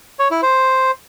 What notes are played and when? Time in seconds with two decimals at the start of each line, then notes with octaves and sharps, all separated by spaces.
0.19 C#5
0.31 E4
0.43 C5